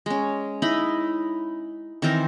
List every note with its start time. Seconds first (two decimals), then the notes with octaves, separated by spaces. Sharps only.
0.06 G#3 C#4
0.62 D#4 E4 B5
2.02 D#3 E3 C4 A#4